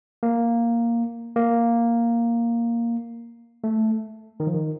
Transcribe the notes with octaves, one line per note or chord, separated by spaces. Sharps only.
A#3
A#3
A3
D#3
F3
D#3